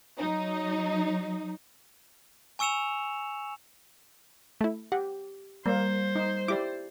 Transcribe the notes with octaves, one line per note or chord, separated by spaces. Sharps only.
F#3 D#4
G#5 C#6 E6 C#7 E7 F7
A3 E4
G4 F#5
G3 A#3 C5
D#4
E4 G4 D5 D6